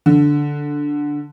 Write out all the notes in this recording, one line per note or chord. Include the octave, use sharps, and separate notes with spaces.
D3